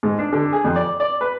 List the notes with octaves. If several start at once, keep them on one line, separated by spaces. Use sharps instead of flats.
G#2
D4
D3
G#4
F2
D5
D5
B4